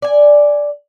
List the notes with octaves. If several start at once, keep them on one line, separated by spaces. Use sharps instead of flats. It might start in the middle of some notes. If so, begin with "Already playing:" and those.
D5 G#5